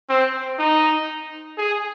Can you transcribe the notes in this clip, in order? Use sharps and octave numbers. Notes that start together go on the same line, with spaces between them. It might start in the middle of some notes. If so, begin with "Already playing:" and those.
C4
D#4
G#4